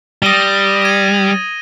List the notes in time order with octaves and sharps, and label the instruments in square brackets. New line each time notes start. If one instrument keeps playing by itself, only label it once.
[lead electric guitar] G3 [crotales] D#6 A#6 D#7 G7
[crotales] D#6 G#6 D#7